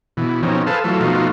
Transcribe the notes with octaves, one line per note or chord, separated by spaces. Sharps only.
B2 E3
B2 F3 C4 C#4 D#4
G#4 A4 B4 C5 F5 A5
E3 F#3 A3 F4 A4
B2 F3 A3 D#4 F4 F#4